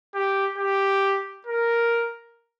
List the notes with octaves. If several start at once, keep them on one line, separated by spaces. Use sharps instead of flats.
G4
G4
A#4